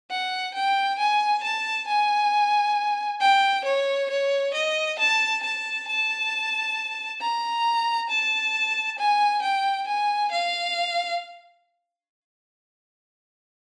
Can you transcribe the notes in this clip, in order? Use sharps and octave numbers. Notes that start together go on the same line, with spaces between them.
F#5
G5
G#5
A5
G#5
G5
C#5
C#5
D#5
A5
A5
A5
A#5
A5
G#5
G5
G#5
F5